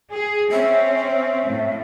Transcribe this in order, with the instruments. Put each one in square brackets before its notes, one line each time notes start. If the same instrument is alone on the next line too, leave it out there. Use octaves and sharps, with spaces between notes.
[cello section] G#4
[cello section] C4 C#4 [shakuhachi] E5
[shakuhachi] E5
[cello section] A2